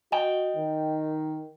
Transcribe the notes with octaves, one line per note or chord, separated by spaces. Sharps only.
F#4 D#5 G5
D#3